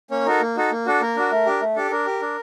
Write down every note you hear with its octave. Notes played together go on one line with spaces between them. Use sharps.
A#3 C#4 C#5
D#4 F#4 A4 A#4
A#3
D#4 F#4 A4
A#3
D4 F#4 A4
A#3 A#4
D4 F#4
A3
D4 G4
A3
D4 G4 A4
D4 A#4
G4
D4